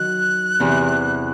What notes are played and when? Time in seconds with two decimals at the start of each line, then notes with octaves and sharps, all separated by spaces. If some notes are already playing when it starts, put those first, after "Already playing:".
Already playing: D#3 F#3 F#6
0.60 E2 C3 E3